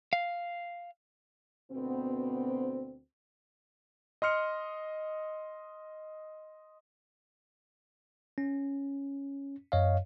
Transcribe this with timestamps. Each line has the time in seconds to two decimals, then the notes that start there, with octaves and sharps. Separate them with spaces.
0.13 F5
1.72 D2 B2 B3 C4
4.22 D#5 C6 F6 C#7
8.38 C#4
9.72 F#2 C#5 D#5 F5